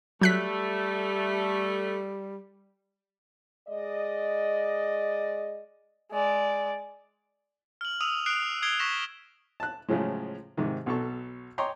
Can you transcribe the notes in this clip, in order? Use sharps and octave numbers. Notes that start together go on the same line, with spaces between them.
F#3 G3 A3 F#6 B6
G#3 D5 D#5
G#3 D5
F6 F#7
D#6 E6 D#7 F7
D#6 F#6 C7 D7 F7
D#6 G#6 C7 D7 F7 G7
C#6 A#6 B6 E7
A5 F#6
A2 C#3 F3 F#3 G#3
G#2 C3 D#3
B1 B2 A4 C#6
C#5 D#5 G5 A#5 C6 D6